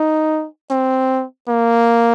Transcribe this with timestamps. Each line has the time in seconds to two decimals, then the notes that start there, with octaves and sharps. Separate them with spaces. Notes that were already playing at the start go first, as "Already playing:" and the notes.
Already playing: D#4
0.70 C4
1.48 A#3